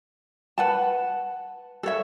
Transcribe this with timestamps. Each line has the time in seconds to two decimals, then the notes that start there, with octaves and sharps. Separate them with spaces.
0.58 B4 F#5 A5
1.83 A4 C#5 E5